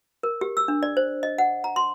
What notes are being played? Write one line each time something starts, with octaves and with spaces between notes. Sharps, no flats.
A#4
G4
E6
D4
D5
C5
D#5
F#5
A#5
C6